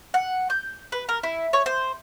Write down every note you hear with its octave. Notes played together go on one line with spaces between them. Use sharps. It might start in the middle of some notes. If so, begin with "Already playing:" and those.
F#5
G6
B4
A#4
E4
C#5
C5